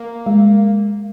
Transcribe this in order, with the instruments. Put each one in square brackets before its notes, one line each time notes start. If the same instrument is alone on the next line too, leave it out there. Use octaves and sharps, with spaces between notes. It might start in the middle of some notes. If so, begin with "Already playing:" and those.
Already playing: [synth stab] A#3
[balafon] G#3